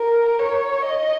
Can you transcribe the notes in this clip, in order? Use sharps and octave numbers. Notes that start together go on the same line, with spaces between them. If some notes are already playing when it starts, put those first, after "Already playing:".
Already playing: A#4
C#5
D#5